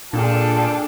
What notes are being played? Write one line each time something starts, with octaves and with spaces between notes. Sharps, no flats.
A#2 D4 F4 G#4 A4 G5 A5